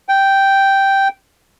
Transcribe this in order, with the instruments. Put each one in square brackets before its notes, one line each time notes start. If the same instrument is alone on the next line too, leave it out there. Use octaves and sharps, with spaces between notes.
[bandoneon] G5